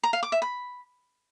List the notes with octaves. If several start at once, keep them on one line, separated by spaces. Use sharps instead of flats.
A#5
F5
D6
E5
B5